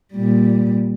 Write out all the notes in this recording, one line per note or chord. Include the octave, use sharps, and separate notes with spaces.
A#2 G3